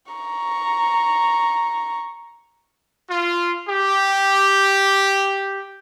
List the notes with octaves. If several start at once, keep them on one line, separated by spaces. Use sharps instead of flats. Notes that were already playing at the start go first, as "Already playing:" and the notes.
A#5 C#6
F4
G4